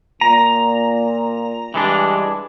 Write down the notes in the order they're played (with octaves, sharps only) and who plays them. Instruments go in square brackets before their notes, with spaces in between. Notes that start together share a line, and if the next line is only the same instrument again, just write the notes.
[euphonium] A#2 [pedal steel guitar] A#5
[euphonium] G2 [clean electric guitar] E3 G#3 D4